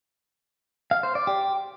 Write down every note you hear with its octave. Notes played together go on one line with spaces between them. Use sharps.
F5
C5
D5
G4